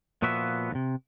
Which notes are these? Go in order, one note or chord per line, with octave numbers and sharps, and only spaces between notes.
A#2 F3 B3 F#4 E5
D#2 C3